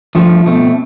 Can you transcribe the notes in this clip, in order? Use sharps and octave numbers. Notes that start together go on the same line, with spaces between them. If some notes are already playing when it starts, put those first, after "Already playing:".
G2 F3 A3
B2 A3 C4